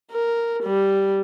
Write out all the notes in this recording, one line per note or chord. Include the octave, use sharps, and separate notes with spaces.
A#4
G3